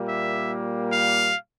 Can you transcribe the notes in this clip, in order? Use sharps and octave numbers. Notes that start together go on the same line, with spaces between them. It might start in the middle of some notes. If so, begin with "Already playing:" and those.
Already playing: A#2 G3 A#3
E5
F5